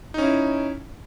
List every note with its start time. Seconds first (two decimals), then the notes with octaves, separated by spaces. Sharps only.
0.14 D#4
0.18 C#4
0.22 E4